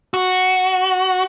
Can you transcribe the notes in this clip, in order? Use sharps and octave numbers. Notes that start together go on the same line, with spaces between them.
F#4